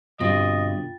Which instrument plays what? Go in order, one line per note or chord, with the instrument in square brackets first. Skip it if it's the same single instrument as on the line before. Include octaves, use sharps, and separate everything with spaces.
[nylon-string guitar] G2 C4 [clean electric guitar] B2 D3 [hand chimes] F4 G5 A6 [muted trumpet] D#5